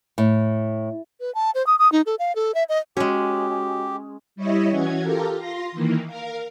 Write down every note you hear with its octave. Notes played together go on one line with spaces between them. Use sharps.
A2
B4
A5
C5
D#6
D#6
D#4
A4
F5
A4
E5
D#5
G#3 C#4 F#4 G4
G3 E4 C#5 D#5 E5
E3 C#4 F#4 G#6
F4 G4 A4 A#4
F4 C6 A#6
D#3 E3 A#3
A#4 F5